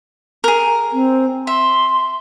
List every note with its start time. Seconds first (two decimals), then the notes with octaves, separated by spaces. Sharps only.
0.44 G#4 A#4
0.93 C4
1.47 E5 C6